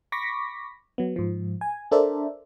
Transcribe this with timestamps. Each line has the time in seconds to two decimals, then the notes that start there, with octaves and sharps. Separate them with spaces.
0.12 B5 C#6 D6 A#6 B6
0.98 F#3 B3
1.16 G#2 F3
1.61 G#5
1.91 D4 A4 A#4 C5 D5 E5